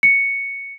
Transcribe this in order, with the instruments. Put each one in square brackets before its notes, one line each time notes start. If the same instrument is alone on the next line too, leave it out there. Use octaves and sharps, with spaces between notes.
[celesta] C#7